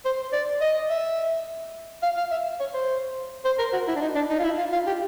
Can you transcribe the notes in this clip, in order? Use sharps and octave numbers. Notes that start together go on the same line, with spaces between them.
C5
D5
D#5
E5
F5
F5
E5
C#5
C5
C5
A#4
F#4
E4
D4
D#4
D4
D#4
F4
E4
F4
F4
G4